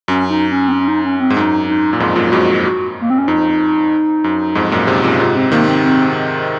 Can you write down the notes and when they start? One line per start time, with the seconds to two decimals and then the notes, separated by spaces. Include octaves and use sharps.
0.08 F#2 C#4
0.30 D#4
0.51 C#4
0.68 C4
0.72 C#4
0.82 C#4
0.88 D#4
1.04 C#4
1.20 C4
1.30 G#2
1.36 F#2 D#4
1.68 D#4
1.93 A#2
2.00 F2 G#2 F4
2.16 F#2 A#2
2.24 F4
2.32 F2 G#2 F#4
2.64 F#4
3.01 A#3
3.10 C4
3.18 C#4
3.28 F2 D#4
4.24 F#2
4.55 F2 G#2
4.71 F#2 A#2
4.87 G#2 C3
5.04 A#2 C#3
5.20 G#2 C3 F4
5.36 C4
5.52 C3 D#3 A#3
5.68 C4
5.84 C4